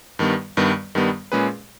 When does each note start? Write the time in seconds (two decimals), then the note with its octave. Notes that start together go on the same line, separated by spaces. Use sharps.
0.19 G2 D#3 G3 B3
0.57 G2 D#3 G3 B3
0.95 G2 D#3 G3 B3
1.32 A#2 G#3 C#4 G#4 B4